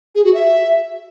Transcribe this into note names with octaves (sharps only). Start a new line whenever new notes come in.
G#4
F#4
E5